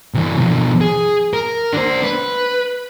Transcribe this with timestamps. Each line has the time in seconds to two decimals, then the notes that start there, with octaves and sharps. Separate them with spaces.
0.14 C3 E3
0.38 B2 F3
0.81 G#4
1.33 A#4
1.73 D4 C5
2.03 B4